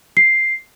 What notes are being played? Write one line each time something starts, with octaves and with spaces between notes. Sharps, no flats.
C7